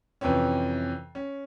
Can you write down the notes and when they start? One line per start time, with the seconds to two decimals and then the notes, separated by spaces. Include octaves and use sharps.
0.21 F2 C3 E3 C4 C#4
1.15 C#4